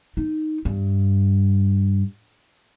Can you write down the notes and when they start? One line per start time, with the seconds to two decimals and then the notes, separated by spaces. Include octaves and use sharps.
0.17 D#4
0.65 G2